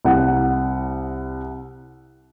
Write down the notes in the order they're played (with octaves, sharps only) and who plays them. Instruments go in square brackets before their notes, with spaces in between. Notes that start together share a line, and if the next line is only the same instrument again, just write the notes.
[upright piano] C2 F#5